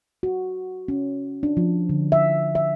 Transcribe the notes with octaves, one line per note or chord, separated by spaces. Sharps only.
F#4
C#4
D4
F3
D3
E5
E5